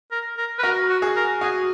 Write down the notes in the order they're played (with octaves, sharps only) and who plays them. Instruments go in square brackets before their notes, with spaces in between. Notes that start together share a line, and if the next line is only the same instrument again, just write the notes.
[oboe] A#4
A#4
B4
[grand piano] F#4 [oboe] A#4
[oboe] F#4
[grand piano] G#4
[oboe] A#4
[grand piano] F#4 [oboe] G#4